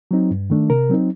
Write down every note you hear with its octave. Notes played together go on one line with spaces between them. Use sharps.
F#3 C4 D#4
G2
D#3 A3 D4
C3 A#4
F#3 C4 D#4